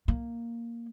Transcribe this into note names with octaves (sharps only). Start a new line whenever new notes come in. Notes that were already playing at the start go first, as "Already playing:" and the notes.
A#3